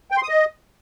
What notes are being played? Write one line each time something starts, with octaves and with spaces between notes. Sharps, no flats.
G5
C6
D#6
D#5